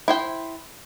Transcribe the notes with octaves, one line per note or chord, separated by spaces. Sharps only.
E4 C5 G5